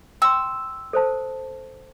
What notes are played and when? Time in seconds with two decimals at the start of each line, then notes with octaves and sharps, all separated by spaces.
0.22 G5 C6 E6
0.93 A4 C5 A5